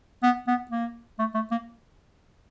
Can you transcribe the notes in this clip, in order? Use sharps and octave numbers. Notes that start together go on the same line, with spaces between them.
B3
B3
A#3
A3
A3
A#3